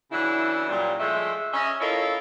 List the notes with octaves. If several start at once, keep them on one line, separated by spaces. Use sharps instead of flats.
C#3 E3 F#3 D4 E4
A#2 F#3 G3
F3 G#3 A3 C5 D#5 E5
C#4 D#5 E5
E4 F4 A4 A#4 C#5 D#5